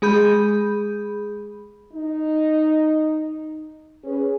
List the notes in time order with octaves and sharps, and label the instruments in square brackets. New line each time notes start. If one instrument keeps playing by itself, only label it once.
[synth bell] G#3 G#4 B5 G6
[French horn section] D#4
C#4 G#4 B4